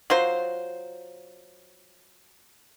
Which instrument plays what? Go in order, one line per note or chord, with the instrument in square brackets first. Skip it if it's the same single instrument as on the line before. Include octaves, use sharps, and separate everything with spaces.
[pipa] F#3 F4 C5